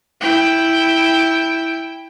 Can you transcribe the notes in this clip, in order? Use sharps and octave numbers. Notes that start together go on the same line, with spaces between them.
E4 G5